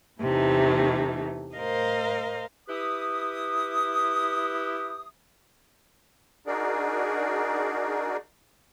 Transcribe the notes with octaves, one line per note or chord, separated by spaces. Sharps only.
E2 C3 E3 A3 D#4
A2 A#4 C5 D#5 F5
E4 G4 B4 D#6
D4 D#4 F#4 G#4 A#4 D5